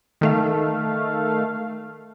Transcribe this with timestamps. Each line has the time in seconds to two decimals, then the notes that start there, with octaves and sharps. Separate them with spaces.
0.21 D#3 A3 F5